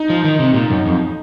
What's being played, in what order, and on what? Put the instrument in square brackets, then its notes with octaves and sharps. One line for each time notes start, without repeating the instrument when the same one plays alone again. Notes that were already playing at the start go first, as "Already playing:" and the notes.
Already playing: [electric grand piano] D#4
[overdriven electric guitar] F3
D#3
C3
A#2
F#2
F2